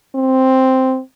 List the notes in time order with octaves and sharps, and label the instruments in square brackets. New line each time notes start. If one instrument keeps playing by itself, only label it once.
[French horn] C4